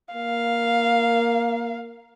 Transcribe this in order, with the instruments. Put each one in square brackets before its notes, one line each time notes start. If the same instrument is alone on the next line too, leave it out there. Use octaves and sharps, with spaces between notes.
[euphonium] A#3 [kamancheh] F5